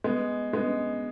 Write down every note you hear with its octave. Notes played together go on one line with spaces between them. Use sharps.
G#3 B3
G#3 B3